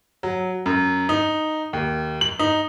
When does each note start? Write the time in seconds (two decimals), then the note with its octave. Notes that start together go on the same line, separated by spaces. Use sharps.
0.23 F#3
0.66 F#2
1.09 D#4
1.73 D#2
2.21 F#7
2.39 D#4